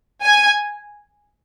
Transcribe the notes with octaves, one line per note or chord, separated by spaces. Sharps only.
G#5